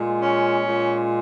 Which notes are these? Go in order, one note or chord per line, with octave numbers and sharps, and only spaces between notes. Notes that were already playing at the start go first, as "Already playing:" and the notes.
Already playing: A#2 G#3
C#4
A#2 G#3